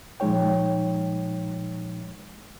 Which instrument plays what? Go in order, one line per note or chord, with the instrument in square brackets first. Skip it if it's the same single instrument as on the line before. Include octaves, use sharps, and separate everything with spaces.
[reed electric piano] A#2 F3 G#3 D#4 C#5 G5